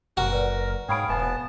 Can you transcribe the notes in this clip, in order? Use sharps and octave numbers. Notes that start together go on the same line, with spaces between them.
F#1 F#4 A#4
B4 D5
G#2 G#4 C#5 F5 G5 B5 D7
E1 B3 F5 G#5 A5 B5